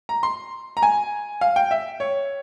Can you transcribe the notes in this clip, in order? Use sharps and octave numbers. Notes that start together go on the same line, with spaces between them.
A#5
C6
A#5
G#5
F5
G5
E5
C#5